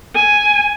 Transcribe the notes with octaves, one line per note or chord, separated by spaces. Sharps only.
G#5